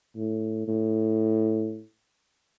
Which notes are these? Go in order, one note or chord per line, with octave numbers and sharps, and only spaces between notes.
A2
A2